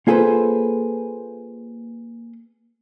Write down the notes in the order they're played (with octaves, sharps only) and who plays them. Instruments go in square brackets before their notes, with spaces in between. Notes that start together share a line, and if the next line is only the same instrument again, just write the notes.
[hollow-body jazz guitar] A#3 F4 G#4 A4 B4 C5